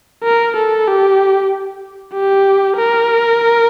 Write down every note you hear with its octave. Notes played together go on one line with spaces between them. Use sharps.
A#4
A4
G4
G4
A#4